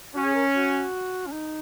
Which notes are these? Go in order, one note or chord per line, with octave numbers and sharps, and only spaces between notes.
C#4 F#4
G#4
A#4
F#4
C#4
D#4